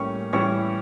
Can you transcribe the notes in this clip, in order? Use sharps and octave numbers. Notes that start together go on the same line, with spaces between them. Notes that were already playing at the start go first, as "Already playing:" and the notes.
Already playing: A2 G3 A#3 C#4 C#6
A2 E3 G3 C#4 E4 C#6